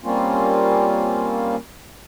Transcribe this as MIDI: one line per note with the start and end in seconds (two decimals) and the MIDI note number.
0.04 1.55 55
0.04 1.55 58
0.04 1.55 60
0.04 1.55 61
0.04 1.55 65